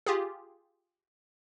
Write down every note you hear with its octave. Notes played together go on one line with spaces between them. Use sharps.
F4 G4 G#4